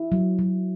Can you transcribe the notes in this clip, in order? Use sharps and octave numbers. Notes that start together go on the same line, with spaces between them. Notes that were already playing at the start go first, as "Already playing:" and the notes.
Already playing: E4
F#3
F#3